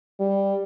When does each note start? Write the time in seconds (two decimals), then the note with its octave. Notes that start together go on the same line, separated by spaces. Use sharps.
0.20 G3